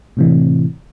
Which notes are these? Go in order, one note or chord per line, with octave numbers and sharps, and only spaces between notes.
A2 C3 E3